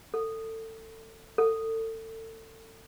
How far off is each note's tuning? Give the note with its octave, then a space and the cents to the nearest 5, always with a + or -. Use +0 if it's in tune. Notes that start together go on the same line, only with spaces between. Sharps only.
A4 +25
A4 +30